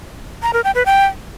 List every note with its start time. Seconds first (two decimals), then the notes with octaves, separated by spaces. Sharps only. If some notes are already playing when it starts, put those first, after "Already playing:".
0.43 A#5
0.53 A#4
0.64 G5
0.75 B4
0.86 G5